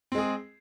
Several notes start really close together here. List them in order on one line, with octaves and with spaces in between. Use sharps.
C4 G#3 G#4